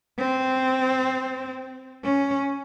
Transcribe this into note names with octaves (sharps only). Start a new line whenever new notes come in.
C4
C#4